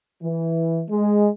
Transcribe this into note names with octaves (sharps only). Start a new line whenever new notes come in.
E3
G#3